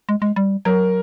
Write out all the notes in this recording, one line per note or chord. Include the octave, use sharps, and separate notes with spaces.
G#3
G#3
G3
F#3 A#4